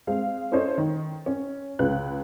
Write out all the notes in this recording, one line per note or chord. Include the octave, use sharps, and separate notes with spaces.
G#3 C4 F5
C#4 E4 A4 C5 C#5 D#5
D#3
C#4
C#2 C#3 B4 F#6